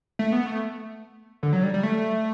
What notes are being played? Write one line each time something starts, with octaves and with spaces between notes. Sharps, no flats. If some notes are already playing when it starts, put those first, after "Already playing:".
A3
B3
A3
D3
F#3
G3
G3
A3